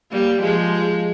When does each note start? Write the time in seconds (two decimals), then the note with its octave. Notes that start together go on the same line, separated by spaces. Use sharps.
0.11 G3 A#3
0.42 F3 G#3